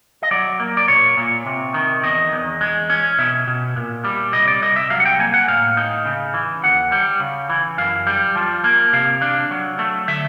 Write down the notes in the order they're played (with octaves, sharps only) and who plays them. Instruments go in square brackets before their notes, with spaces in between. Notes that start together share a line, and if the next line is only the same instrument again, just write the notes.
[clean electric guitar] D#5
F#3 D5
A#3
D5
A#2 C#5
A#2
C3
D#3
E2 D#5
E2
G#3
C#4
B2 E5
B2
A#2
G3
C2 D#5
D5
C2 D#5
E5
F#3 F5
F#5
G5
A#3 G#5
F#5
A2 F5
D#4
C#3
E3
D#2 F#5
G3
C#3
E3
F#2 F5
G3
F3
A#3
C3 F5
D4
F#3
A3
D3 E5